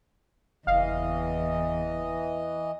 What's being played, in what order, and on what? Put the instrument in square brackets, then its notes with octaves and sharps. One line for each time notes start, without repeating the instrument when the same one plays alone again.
[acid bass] F#1 [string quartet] E2 [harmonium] E3 D#5 [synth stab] F5